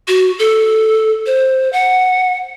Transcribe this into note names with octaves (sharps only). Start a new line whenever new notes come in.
F#4
A4
C5
F#5